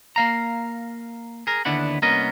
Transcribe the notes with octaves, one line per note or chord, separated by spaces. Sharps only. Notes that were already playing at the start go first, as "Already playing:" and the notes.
A#3 F5 A#5
G#4 A#4
D#2 D3 B3 D4 E4 F#5
C2 A#3 B3 C#4 A#4 D#5